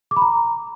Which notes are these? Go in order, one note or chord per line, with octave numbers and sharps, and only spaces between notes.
D6
B5
A#5